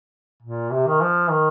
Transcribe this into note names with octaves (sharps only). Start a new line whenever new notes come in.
A#2
C3
D#3
F3
D#3